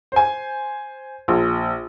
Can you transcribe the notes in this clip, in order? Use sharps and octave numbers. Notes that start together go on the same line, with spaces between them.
C5 G#5
A#1